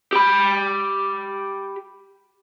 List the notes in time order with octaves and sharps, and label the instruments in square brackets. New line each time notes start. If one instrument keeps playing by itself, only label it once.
[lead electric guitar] G4 B5